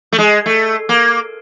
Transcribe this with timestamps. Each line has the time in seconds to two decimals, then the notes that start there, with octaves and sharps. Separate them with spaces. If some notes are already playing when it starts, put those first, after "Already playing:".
0.13 A3
0.18 G#3
0.46 A3
0.89 A#3